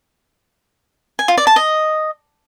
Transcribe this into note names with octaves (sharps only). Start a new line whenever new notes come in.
G#5
F4
D5
A5
D#5